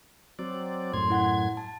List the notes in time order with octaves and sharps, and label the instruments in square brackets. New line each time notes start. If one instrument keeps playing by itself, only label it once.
[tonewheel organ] F#3 C4 D5
[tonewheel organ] F#2 A2 G#6 [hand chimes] C6
[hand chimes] E4 F#5
A5